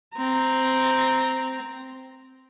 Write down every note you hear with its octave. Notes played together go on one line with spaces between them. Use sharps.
C4 A#5